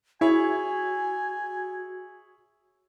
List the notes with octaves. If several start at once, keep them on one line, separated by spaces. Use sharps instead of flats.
E4 F#4 G#4 C#5 E5 G#5